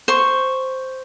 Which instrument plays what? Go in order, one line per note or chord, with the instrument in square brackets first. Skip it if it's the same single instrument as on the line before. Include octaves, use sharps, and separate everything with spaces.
[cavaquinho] C5 C#6